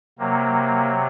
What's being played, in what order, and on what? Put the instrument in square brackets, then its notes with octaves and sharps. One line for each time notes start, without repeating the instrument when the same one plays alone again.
[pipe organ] C3 F#3 A#3